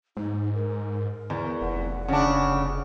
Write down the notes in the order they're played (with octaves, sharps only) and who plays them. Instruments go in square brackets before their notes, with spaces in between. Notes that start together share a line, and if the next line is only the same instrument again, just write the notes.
[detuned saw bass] G#2 [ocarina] D#4
[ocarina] A#4
[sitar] E2
[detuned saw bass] F1 [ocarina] F#5
[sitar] C#3 D4